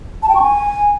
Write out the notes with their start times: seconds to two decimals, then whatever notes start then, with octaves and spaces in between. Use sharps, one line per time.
0.23 A5
0.29 G5
0.35 C#6
0.41 G#5